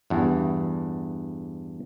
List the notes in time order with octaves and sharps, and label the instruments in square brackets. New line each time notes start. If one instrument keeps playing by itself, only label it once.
[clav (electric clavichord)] E2 G2